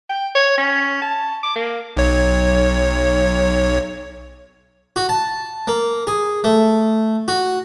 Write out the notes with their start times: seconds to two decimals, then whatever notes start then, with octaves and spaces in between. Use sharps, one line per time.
0.10 G5
0.35 C#5
0.58 C#4
1.02 A5
1.43 D6
1.55 A#3
1.97 B1 C#5
4.96 F#4
5.09 A5
5.68 A#3
6.07 G#4
6.44 A3
7.28 F#4